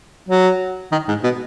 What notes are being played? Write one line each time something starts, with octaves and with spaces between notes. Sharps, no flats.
F#3
D#3
G#2
B2